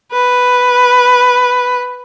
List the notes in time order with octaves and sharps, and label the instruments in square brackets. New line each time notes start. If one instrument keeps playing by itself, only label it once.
[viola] B4